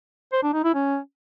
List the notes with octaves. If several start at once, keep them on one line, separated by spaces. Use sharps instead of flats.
C5
D4
D#4
E4
C#4